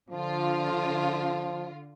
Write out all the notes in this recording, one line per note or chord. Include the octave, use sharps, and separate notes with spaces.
D3 F3 F4